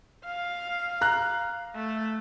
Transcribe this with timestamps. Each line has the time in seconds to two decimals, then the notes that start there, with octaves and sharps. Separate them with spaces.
0.25 F5
1.01 A#5 F#6
1.76 A3